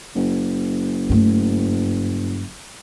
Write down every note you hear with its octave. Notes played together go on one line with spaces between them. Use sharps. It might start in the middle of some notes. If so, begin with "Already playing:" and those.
F#1
G2 A3